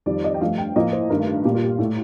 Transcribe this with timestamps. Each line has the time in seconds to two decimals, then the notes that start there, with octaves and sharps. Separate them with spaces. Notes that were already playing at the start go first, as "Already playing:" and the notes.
0.06 F2 D#3 G3 D5
0.24 D#5
0.34 G5
0.41 G2 F3 A3 F5
0.58 G5
0.76 A2 F3 A#3 D#5
0.93 C5
1.10 G2 D#3 A3 A#4
1.45 A#2 G3 A#3 G4
1.55 F4
1.64 G4
1.79 A2 A3